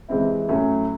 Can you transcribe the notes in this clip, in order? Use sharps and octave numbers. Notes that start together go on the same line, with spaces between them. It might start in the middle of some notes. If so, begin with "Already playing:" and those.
C3 E3 G#3 C4 E4
A2 F#3 A3 C#4 E4